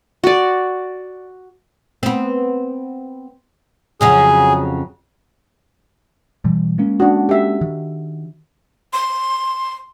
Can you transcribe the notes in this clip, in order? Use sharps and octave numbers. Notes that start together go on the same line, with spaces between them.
F#4 D5
B3 C4
F2 C#3 F#3 G#4
B2 E3 G3
G#3 A#3 C#4
D4 F#4
G4 E5
D#3
C6